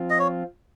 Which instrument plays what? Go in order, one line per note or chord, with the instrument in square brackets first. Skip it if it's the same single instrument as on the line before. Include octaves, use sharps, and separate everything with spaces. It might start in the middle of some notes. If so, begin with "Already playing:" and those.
Already playing: [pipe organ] F3 C4 F4
[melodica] D#5
C#5